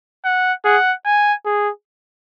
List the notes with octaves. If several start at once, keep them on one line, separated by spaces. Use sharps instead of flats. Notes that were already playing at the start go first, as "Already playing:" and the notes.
F#5
G#4 F#5
G#5
G#4